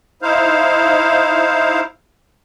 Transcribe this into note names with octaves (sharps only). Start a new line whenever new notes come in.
D#4 E4 C5 F5